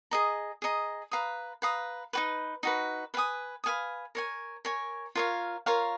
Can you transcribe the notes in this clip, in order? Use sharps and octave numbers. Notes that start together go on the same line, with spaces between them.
G#4 D#5 A#5
G#4 D#5 A#5
B4 F5 A#5 D#6
B4 F5 A#5 D#6
D#4 F#4 B4
D#4 F#4 B4
B4 F5 G#5 D#6
B4 F5 G#5 D#6
A#4 C#5 G#5
A#4 C#5 G#5
F4 A#4 C#5 F5
F4 A#4 C#5 F5